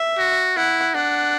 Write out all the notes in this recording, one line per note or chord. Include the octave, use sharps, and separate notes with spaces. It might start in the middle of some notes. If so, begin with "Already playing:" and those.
Already playing: E5
F#4
E4 F#5
D4 F#5